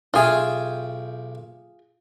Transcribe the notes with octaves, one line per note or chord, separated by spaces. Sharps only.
B1 F4 G#4 E5 G5